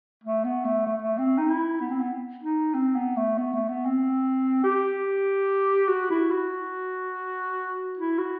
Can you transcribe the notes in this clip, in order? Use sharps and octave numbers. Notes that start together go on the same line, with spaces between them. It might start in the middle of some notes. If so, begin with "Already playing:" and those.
A3
B3
A3
A3
A3
C4
D#4
E4
B3
C4
B3
D#4
C4
B3
A3
B3
A3
B3
C4
G4
F#4
E4
F#4
E4
F#4